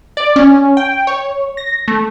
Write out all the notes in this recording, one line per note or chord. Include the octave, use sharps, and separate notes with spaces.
D5
C#4
G5
C#5
A#6
A3